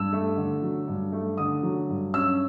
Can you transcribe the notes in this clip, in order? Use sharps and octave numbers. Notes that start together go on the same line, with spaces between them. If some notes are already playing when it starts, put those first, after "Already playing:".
Already playing: G2 E6
A3
D3
F#3
G2
A3
D3 D#6
F#3
G2
C#4 E6